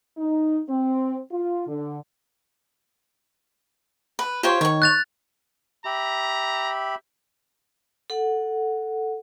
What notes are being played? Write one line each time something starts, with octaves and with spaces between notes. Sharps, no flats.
D#4
C4
F4
D3
B4
F4 G4 C5 C#5
D#3 C#5 C#6
F#6 A6 F7
G4 E5 A#5 B5
A4 F#5